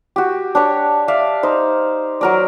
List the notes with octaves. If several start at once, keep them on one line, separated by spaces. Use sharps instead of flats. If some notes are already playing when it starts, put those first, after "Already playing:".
F#4 G4
D4 G4 C#5
D5 E5 F5
D#4 C5
F#3 A#4 D5